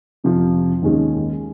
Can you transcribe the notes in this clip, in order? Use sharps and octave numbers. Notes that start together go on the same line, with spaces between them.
F2 C3 F3
D#2 D#3 G#3 C#4